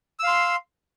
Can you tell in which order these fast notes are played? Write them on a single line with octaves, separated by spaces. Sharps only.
E6 F5 C6